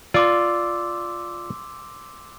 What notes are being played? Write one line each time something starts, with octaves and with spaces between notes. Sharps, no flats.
F4 D5 C6 D6 E6